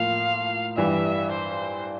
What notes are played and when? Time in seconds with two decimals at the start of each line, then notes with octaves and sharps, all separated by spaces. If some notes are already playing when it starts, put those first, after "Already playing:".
Already playing: A2 F3 A#3 F4 F5
0.77 G2 E3 G3 E5
1.31 C5